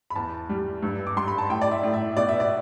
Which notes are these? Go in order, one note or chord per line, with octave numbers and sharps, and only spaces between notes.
B5
E2 A5
G3
G2
D6
G3 C6
B5
A5
A2 G5
D5
E5
A2
E5
B2 D5
E5
D5